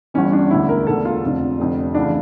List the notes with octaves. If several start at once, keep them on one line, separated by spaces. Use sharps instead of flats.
G1 G2 E3 C#4
D4
E1 D2 D3 E4
A#4
E1 D2 D3 A4
F4
F1 F2 D3
F1 F2 D3
D2 C#3 E3 D4